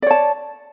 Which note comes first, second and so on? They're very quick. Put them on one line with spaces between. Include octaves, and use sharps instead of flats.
D5 C#5 A5